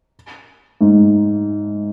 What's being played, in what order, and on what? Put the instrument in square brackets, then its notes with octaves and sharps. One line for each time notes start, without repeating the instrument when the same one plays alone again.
[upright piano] G#2